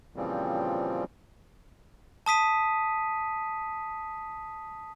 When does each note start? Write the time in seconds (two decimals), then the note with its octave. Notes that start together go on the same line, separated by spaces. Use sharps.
0.16 A#2 C#3 E3 F3 G3 C4
2.26 A5 D#6 B6 D#7